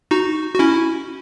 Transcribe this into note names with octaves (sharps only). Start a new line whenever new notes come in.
D#4 F#4
F#4
C#4 E4